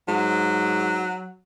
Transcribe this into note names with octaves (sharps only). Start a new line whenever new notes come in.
G#2 F#3